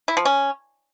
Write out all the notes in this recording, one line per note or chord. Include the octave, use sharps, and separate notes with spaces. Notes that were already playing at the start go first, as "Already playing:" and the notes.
E4
F3
C#4